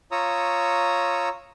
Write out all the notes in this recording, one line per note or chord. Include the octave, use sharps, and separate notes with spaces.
F4 C#5 A#5 C#6 D#6 E6